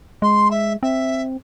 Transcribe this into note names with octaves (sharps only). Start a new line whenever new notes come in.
G#3 C6
E5
C4 E5